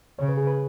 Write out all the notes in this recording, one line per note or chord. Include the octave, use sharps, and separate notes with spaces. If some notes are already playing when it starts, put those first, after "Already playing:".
C#3 C#5
B4
G#4
B4